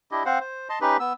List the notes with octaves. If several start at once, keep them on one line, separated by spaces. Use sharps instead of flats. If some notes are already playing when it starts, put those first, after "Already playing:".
D4 E4 G4 D#5
C4 C5 F5 F#5
C5
D#5 A5 C6
C#4 D#4 G4 B4
B3 E6